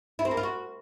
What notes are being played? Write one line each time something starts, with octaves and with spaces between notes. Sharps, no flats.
E4
C4
A#3
F4
F#4